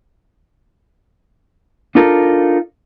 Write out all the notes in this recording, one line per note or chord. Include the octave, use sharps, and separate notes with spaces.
D4 D#4 F4 A4 A#4